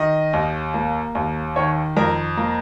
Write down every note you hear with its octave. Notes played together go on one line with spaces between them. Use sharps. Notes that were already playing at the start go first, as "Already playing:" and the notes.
Already playing: D#3 D#5
D#2
A#3
D#2
D#3 C#5
F2 A#4
A#3